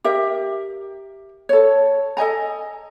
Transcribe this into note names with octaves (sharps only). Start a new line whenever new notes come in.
G4 A#4 E5
A4 C#5
A4 D#5 G#5 A#5